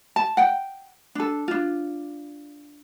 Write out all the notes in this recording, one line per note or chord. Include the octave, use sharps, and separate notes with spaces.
A5
F#5 G5
D4 A4
D4 F4